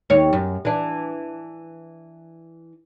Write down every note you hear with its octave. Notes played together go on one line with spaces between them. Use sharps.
D#2 C#5
F#2
E3 D4